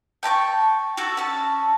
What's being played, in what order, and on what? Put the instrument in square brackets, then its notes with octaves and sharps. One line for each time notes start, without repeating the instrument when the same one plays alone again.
[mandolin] G5 A5 A#5 C#6
F#4 A4
C#4 A5